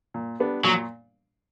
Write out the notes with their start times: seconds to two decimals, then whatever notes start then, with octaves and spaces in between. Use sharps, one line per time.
0.14 A#2
0.40 G3 B3 D4
0.64 A#2 F#3